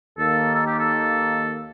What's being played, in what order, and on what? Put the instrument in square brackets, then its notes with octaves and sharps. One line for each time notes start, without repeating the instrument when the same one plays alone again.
[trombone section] D#2 D#3 A#3 [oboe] A4
[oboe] A4
G4
A4